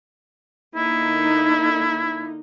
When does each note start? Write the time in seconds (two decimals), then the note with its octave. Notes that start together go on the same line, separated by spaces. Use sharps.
0.75 D3 A#3 D#4 E4